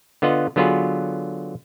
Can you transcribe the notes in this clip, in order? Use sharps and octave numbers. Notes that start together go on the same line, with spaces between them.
D3 B3 F4 D#5 F#5
D3 F#3 B3 F4 G#4 B4